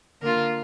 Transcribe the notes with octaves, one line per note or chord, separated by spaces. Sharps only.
D3 A#3 F4 A#4